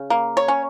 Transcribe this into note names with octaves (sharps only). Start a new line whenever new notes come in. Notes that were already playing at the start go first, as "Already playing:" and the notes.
Already playing: C#3
A#3
C#5
C#4